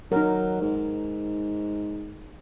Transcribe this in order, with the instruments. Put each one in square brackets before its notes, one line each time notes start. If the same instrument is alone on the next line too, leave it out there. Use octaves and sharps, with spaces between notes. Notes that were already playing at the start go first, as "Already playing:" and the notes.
[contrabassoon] F#3 [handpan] D#4 A#4
[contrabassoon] G#2